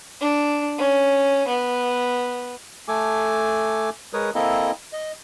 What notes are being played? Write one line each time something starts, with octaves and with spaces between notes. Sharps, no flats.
D4
C#4
B3
A3 A4 G#5 D6
G#3 A#4 B4 C#5 D#6
A#3 C4 E4 A4 D#5 A#5
D#5